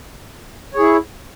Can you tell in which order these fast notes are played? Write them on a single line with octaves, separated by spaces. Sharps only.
C#5 G#4 E4